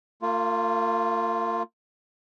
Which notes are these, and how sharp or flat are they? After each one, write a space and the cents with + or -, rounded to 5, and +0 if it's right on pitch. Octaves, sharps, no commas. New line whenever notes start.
A#3 -45 F4 +0